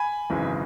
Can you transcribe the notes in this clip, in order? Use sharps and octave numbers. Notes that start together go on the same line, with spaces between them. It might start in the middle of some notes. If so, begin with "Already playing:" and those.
Already playing: G#5 B5
G#1 F#2 C#3 E3 G#3